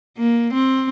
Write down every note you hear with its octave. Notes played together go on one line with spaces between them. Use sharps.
A#3
C4